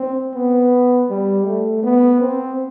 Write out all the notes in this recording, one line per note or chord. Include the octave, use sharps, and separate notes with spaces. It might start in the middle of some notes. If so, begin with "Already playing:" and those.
Already playing: C4
B3
G3
A3
B3
C4